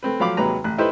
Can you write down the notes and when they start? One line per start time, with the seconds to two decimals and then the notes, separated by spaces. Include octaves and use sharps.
0.03 A3 C4 B4
0.20 F3 F#3 A3 F5 B5 D6
0.37 D#2 C3 F#3 G#3 B4 A#5
0.64 A1 F#6
0.78 A3 D#4 E4 G4 B4 C5